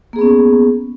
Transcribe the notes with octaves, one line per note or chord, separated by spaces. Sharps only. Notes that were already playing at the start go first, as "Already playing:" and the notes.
A#3 B3 C#4 G#4